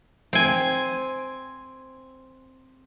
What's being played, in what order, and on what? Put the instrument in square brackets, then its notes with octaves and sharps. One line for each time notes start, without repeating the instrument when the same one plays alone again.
[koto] C4 G#5